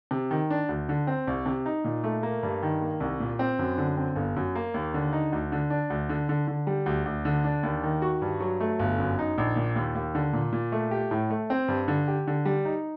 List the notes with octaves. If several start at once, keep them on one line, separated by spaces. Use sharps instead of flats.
C3
D#3
D4
D2
D3
C4
C2
C3
D#4
A#2
A3
A#3
G2
D#3
A#3
C2
A#2
C4
F#2
D3
C4
G1
F#2
A#3
D#2
D3
D#4
D2
D3
D4
D2
D3
D3
D3
G3
D2
D2
D3
D4
D#2
D#3
F#4
G2
F#3
A3
G1
F#2
D#4
A#1
A#2
D#2
D#2
D3
A#2
A#2
A3
G4
A2
A3
C4
G2
D3
G4
D3
G3
D#4